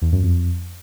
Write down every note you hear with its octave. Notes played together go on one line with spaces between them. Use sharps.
E2
F#2
F2